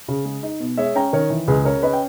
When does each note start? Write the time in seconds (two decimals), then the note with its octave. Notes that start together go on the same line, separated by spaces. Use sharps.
0.08 C#3
0.25 G#3
0.43 D#4
0.60 B2
0.77 G#3 C#5 E5
0.95 C#4 G5 A#5
1.13 D#3 A#4 C#5
1.30 E3
1.48 C#2 G#4 B4
1.65 C#3 A#4 C#5
1.83 C#4 B4 D#5
1.93 G5